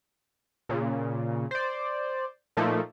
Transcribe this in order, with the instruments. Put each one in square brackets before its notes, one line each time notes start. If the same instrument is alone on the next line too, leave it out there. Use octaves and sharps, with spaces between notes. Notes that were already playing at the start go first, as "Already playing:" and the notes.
[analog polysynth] A#2 C#3
C5 D5
A#2 F3 A3 A#3 D#4